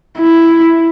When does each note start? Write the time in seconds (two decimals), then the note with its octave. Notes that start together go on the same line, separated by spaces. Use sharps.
0.19 E4